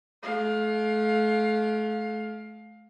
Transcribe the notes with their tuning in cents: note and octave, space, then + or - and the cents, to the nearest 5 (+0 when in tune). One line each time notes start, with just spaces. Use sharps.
A3 -40 F5 +20